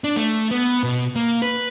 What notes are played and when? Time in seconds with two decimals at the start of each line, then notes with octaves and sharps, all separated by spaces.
0.04 D4
0.16 A3
0.51 B3
0.83 B2
1.16 A#3
1.42 B4